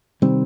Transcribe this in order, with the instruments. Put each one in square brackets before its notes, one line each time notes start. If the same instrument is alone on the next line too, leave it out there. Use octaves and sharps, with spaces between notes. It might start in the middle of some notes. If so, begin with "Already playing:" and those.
[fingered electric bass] C3 D#3 G3 C4